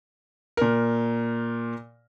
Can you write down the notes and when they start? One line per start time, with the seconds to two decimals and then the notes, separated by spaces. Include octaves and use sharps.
0.57 A#2 A#4